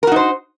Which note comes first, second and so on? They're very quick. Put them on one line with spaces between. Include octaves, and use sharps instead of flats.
A#4 F#4 D#4 C5